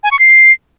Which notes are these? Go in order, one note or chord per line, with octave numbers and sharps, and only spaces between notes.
G#5
C#6
C7